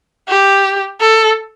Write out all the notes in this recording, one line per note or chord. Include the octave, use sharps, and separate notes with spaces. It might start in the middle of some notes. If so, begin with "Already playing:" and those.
G4
A4